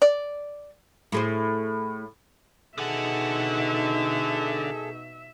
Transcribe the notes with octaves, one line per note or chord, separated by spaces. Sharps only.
D5
A2 G#4 C5
B2 D3 D#4 G#4 A4 E5 F#5